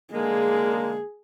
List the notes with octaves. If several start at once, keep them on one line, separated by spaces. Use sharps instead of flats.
D3 G#3 A#3 G#4